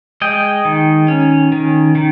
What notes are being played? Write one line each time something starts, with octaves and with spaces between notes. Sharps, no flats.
G#3 D#5 G5
D#3
C#4
D#3
D#3